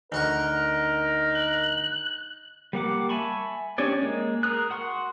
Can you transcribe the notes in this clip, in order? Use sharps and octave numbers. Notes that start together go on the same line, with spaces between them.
D2 D#4 A#4 F#5 C#6
F#6
G3 A#3 F#5 D6
E5 G#5 A5 B5 C#6
C#4 D4 G4 C#5 D5
G#3 A#3
G#4 A#4 A#5 D#6 F#6
F#4 F#5 C6 C#6